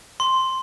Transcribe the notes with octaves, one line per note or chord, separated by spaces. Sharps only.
C6